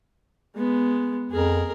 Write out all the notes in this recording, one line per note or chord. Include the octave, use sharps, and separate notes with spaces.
G#3 B3
F2 G#4 A#4